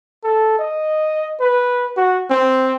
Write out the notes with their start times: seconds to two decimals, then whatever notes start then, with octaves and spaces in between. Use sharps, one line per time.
0.24 A4
0.59 D#5
1.40 B4
1.97 F#4
2.30 C4